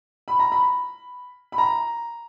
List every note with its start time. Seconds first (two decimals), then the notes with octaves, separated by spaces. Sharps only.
0.28 B5
0.39 A#5
0.52 B5
1.52 B5
1.58 A#5